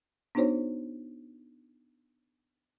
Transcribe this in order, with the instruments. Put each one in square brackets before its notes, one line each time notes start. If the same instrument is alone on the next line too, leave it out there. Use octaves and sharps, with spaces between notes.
[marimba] B3 D4 D#4 F#4 C5 C#5